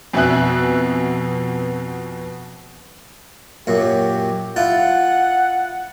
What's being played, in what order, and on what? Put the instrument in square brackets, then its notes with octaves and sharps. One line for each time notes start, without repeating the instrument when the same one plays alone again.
[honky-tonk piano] F2 B2 B3 E5 G#5 F#6
[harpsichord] F#2 A#2 F#3 [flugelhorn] G4
[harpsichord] E4 F4 A5 [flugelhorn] F#5